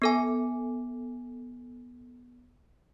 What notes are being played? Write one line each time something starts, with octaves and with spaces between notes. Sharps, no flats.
B3 A4 G#5